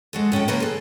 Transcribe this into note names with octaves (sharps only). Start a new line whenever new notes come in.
G#3 F#4 A4
A2 C#4 A4 G5
C#3 F3 A#3 F4 B4
G#4 A4